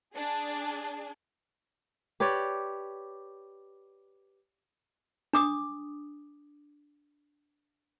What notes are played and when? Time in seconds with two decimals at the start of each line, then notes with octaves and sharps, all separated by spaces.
0.14 D4 G#4
2.20 G4 B4 C#5 D5
5.33 D4 D6 D#6